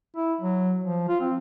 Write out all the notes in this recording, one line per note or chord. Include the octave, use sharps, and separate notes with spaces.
E4
F#3
F3
F4
C4